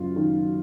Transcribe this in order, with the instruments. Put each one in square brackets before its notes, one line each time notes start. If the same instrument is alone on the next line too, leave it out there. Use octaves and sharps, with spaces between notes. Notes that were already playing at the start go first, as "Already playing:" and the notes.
Already playing: [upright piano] F#1 F#2 F4
D#3